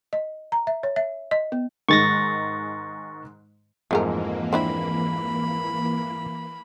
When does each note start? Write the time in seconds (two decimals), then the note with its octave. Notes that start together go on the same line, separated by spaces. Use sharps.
0.13 D#5
0.52 A#5
0.67 E5
0.83 C#5
0.96 E5
1.31 D#5
1.52 B3
1.89 G#2 D#3 G#3 C#6 A6 A#6
3.91 F2 G#2 E3 A3 A#3 G#4 A#4
4.53 C4 D4 E4 B5